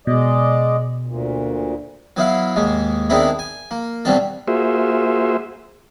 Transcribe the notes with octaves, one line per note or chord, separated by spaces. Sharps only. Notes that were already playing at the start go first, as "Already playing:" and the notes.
B2 G#3 D5 D#5
D2 A#2
F#3 B3 E4 F5
D#2 G#2 G#3
D#3 G#3 B3 C4 D4 E4
G#5
A#3
C2 G2 B2 C4 D4 A4
A#3 F4 F#4 G#4 C5 E5